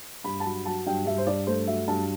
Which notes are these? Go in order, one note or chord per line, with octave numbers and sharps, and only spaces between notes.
G2 B5
A5
F#3 B5
F#3 A5
G2 G5
G2 E5
C5
G2 D5
A3 C5
F#3 E5
G2 A5